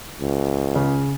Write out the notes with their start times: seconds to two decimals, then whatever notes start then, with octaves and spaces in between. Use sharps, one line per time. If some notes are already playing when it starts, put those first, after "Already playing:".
0.21 C#2
0.75 C#3